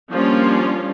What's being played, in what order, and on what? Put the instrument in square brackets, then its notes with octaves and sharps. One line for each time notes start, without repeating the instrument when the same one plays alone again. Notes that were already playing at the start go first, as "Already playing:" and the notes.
[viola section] F3 G3 A#3 C#4 D4 F4